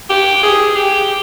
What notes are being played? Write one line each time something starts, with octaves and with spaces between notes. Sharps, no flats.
G4
G#4
G4